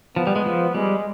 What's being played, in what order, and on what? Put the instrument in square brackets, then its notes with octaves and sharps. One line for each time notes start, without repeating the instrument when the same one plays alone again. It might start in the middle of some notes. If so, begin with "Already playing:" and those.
[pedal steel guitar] F3 [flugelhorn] B3
[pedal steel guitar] G3
G#3
F3
[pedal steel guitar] G3 [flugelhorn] G#3